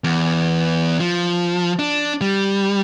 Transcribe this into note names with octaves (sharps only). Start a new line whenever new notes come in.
E2
F3
D4
G3